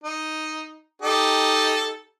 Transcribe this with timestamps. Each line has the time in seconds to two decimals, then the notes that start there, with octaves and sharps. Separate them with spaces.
0.04 D#4
1.02 D#4 G4 A4